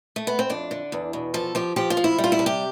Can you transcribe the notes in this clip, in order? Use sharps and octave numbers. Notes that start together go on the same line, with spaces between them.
A3
B3
C4
F2 D4
D3
E2
B2
F3 A4
F3 G4
F3 G4
F4
F3
E4
G3
F4
E4
C3
G4